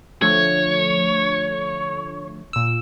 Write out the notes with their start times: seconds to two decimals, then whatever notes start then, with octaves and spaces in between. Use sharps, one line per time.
0.22 D3 F3 A3 C#5
2.53 A#2 E6